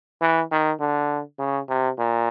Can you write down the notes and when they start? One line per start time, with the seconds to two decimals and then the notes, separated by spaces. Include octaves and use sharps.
0.22 E3
0.51 D#3
0.80 D3
1.39 C#3
1.69 C3
1.99 A#2